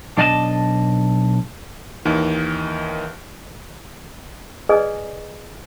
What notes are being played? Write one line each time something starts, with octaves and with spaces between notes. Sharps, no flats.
B1 D4 D5 D#5 F5 A5
D#2 D#3 E3
G#4 B4 D5 D#5 G#5 D#6